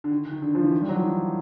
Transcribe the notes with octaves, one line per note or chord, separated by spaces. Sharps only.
D3
D#3
D#3
D3
F3
E3
D#3
G3
F#3
F3
E3